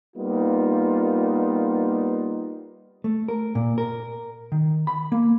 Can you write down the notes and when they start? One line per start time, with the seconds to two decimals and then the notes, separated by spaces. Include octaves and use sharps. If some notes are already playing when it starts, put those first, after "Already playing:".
0.17 G3 A#3 B3 D#4 F4
3.04 A3
3.28 A#4
3.55 A#2
3.78 A#4
4.52 D#3
4.87 B5
5.12 A#3